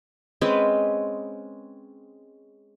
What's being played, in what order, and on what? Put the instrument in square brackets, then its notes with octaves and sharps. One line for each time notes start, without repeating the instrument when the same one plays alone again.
[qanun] G#3 C4 C#4 B4